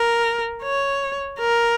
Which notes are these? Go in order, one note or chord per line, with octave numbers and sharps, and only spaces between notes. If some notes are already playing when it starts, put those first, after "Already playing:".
Already playing: A#4
C#5
A#4